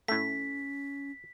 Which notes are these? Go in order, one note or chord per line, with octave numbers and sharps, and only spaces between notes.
A2 A3 C#4 B6